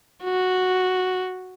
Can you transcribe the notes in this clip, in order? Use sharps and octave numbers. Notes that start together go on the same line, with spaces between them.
F#4